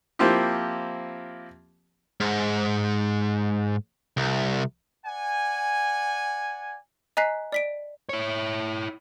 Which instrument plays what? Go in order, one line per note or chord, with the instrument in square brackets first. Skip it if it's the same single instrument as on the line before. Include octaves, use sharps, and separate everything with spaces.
[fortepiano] F3 A#3 C4 E4 F4 G4
[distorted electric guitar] G#2
C2
[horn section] D5 F#5 G#5
[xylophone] D#5 G#5 A#5 F#6 B6 C7
D5 B6 D7
[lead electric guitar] E4 C#5